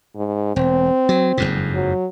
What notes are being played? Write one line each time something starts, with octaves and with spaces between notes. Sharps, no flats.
G#2
E1 C4
F#3
F#1 F2 G#2
F#3